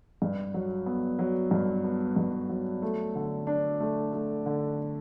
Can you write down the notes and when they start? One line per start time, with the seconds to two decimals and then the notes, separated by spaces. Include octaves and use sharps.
0.22 G2
0.54 F#3
0.86 B3
1.19 F#3
1.51 G2
1.84 B3
2.16 G2
2.49 F#3
2.82 A3
3.15 D3
3.47 D4
3.80 A3
4.13 A3
4.46 D3